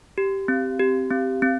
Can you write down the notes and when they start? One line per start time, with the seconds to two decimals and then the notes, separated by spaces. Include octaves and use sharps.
0.18 G4
0.48 C4
0.79 G4
1.11 C4
1.42 C4